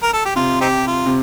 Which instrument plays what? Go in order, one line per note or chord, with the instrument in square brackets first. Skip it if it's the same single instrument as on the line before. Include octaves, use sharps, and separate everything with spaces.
[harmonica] A#4
A4
G4
[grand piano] C3 [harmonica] F4
[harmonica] C4 D#4 G4
F4
[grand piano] C3